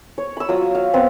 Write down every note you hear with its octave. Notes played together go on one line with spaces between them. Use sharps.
C#5
B5 E6
F#3 F4 D#6
F5
B3 C4